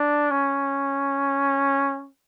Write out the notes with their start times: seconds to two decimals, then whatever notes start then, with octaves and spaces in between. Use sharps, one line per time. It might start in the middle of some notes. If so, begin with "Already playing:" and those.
Already playing: D4
0.31 C#4